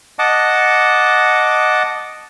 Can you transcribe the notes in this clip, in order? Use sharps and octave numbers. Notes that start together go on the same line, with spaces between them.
D#5 F#5 A5 D6